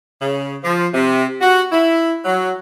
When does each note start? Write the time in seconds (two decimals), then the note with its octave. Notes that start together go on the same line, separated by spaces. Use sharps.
0.21 C#3
0.64 F3
0.93 C3
1.41 F#4
1.72 E4
2.25 F#3